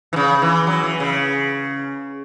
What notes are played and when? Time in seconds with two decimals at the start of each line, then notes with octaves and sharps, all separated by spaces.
0.13 E3
0.16 C#3
0.42 E3
0.67 F#3
0.84 E3
1.00 C#3